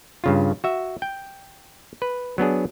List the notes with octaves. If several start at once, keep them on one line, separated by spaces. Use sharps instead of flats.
G2 C#3 F4
F#4 E5
G5
B4
F#3 B3 D4 G#4